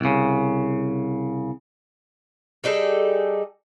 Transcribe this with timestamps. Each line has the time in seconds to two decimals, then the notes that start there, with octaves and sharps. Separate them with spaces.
0.01 C2 C#3
2.64 G3 D#4 G#4 A4